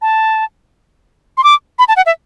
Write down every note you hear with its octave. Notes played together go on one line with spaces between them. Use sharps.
A5
C6
D6
B5
A5
F#5
E5